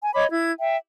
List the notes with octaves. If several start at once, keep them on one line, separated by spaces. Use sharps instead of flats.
G#5
C#5 D#5 B5 D6
E4 G#6
E5 G5